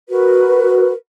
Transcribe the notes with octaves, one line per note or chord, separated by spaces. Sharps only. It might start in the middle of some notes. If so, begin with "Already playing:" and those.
F#4 A#4 B4